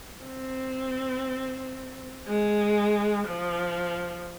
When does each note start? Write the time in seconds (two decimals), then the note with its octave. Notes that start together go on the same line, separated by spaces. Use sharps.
0.25 C4
2.27 G#3
3.27 F3